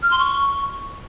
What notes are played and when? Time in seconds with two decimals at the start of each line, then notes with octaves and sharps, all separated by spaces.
0.02 F6
0.11 C6
0.19 C#6